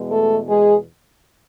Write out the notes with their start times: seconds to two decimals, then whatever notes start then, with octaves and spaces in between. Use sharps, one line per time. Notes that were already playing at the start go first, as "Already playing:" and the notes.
Already playing: E2 B2 G#3
0.10 A3 A4
0.49 G#3 G#4